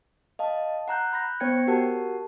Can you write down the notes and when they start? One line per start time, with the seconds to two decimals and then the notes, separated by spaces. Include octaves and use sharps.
0.39 D#5 F5 A5
0.88 F#5 A#5 F#6 G6
1.13 B5 F#6 G6 A#6
1.40 B3 C5 C#5 G5 G#6 C#7
1.67 F#4 G4 A#4 F#5 A5